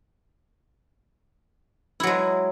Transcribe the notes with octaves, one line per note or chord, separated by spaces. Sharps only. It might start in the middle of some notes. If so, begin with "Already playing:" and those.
F#3 G#3 E4